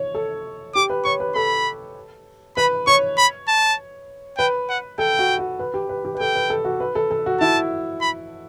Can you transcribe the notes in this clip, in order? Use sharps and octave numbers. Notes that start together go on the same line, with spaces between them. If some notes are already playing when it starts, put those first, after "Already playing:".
Already playing: C#5
A4
G4 D6
B4
C#5 C#6
B4
A4 B5
B4 B5
C#5 C#6
B5
A5
B4 G5
F#5
A4 G5
F#4
F#4
B4
G4
B4
G4
B4
A4 G5
B4
A4
F#4
B4
A4
A4
F#4
E4 A5
B5